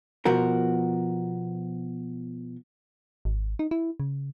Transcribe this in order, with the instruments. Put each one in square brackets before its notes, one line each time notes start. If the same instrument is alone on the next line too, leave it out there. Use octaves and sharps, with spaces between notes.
[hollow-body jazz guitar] B2 F3 F#4 A#4
[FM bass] G#1
D#4
E4
C#3